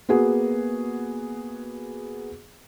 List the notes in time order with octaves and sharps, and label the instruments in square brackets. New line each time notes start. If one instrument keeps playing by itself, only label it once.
[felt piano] A#3 B3 F#4 G#4